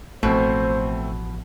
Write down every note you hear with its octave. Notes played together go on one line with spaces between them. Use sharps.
A1 B2 F3 A3 C4 C5